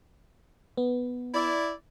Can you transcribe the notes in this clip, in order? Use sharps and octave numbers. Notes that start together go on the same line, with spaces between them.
B3
E4 D5